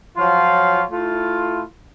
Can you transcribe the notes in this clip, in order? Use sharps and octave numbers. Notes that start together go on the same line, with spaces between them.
F3 F#3 F4 C#5 F5
A3 E4 F4